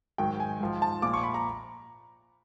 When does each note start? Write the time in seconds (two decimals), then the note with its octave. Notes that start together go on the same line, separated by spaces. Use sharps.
0.18 G#2 D#3 F#3 G5
0.40 G#5
0.61 G#2 F3
0.82 A5
1.02 A#2 F3 D6
1.14 C#6
1.24 B5
1.34 A#5